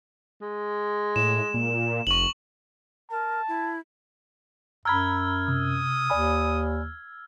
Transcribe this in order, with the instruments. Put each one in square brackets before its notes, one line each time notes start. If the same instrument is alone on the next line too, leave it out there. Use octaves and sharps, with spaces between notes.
[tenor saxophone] G#3
[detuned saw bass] A2 [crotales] E7
[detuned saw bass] A#2
[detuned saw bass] F1 [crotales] C#6 F#7
[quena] A#4 [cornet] A5
[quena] E4
[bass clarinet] F#2 [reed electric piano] A#5 B5 [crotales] E6 F6 G#6
[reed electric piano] C3 [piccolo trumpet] D#6
[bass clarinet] D#2 [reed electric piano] D5 G#5 B5